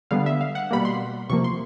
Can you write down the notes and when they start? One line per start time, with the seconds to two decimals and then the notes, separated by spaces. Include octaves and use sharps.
0.11 D3 G3 B3 F5
0.26 E5
0.41 F5
0.55 F#5
0.71 B2 G3 A#3 B5
0.85 C6
1.30 C3 F3 A#3 C#6
1.44 C6